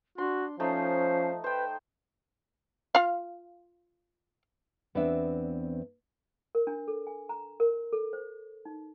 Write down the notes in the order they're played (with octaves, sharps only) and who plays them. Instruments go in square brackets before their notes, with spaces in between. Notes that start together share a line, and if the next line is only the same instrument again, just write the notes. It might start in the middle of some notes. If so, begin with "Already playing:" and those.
[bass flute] D4 [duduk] F#4 [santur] C6
[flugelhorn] F3 [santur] A3 D#4 [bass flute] C#4 [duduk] C5
[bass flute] B4 [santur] C5 G5
[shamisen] F4 F5
[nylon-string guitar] E2 B3 C4 D4 E5
[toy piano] A#4
D4
A4
G#5
A#5
A#4
A4
C5
D#4